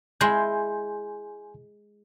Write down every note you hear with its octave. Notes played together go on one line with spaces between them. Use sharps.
G#3 E4 G#5 C6 G6